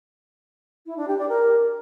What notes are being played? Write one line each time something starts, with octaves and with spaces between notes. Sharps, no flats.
E4
D4
G4
D5
A#4